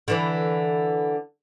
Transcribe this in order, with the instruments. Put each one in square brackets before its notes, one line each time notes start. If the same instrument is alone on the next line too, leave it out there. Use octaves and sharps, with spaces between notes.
[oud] D3 E3 E4